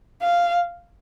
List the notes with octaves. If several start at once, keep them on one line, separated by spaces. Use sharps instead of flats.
F5